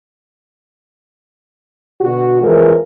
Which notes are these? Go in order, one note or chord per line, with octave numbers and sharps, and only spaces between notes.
B2 D3 F#4
F2 E3 F3 G#3 A#4